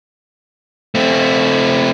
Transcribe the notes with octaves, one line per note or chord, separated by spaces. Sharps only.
A3 C4